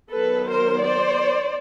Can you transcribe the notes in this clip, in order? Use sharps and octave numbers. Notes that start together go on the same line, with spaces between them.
D#3 F#3 B3 A4 B4
A#4 C5
C5 D5